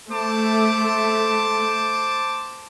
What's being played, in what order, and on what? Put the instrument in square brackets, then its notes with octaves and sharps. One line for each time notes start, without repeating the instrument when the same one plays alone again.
[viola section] A3 [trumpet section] C5 A5 D6